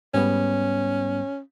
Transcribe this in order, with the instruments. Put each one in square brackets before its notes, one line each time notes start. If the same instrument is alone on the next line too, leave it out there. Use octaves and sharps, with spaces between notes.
[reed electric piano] G#2 G3 B3 [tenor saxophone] C#4